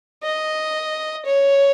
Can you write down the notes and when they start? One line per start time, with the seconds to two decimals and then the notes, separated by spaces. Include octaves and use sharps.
0.23 D#5
1.26 C#5